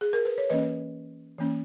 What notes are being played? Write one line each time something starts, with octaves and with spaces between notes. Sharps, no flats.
G#4
A#4
B4
C#5
E3 A#3 C#4 B4 D#5
E3 A#3 C#4